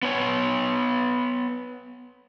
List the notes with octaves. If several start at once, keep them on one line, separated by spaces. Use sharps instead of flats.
B3 C#5